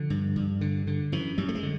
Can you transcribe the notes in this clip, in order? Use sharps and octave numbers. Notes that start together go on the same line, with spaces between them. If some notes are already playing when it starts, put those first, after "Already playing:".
Already playing: D3 F3
G2
G2
D3
D3
F#2 E3
F#2 G3
A3
G#3
D3